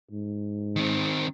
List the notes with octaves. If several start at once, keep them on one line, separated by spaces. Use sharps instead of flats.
G#2
D#3 C4